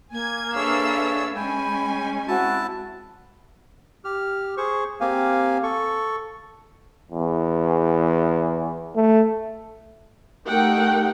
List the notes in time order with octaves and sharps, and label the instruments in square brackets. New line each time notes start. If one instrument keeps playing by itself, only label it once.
[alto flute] A#3 [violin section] G#5 G#6
[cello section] D4 A4 F5 [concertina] G#4 C#5 [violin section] B4 E5 E6
[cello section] G#3 C#4 [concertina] G5 [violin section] G#5 [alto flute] B5
[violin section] C4 [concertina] E4 A5 [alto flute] F#4
[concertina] G4 F6
G#4 C5 C#6
A#3 C4 G4 F5 G#5
A4 C#6
[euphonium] E2
A3
[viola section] A3 D#4 G4 A#4 F#5 G5